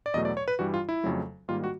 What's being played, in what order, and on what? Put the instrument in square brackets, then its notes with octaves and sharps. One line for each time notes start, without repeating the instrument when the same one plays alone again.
[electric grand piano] D5
E2 B2 F#3 A3 D#5
D5
C#5
B4
G2 E3 G3 F#4
F4
E4
F2 C#3 F#3 A3
G#2 D#3 G3 A#3 F4
F#4